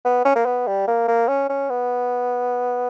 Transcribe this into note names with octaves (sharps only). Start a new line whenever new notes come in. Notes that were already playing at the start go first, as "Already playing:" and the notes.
B3
C#4
A#3
B3
G3
A#3
A#3
C#4
C#4
B3